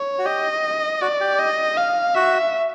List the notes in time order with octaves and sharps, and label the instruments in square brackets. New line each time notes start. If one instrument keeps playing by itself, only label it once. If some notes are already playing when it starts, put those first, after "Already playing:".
Already playing: [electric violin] C#5
[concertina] F#4
[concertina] G4 [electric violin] D#5
[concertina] F#4 [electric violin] D5
[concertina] G4
[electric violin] D#5
F5
[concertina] F#4 [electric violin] E5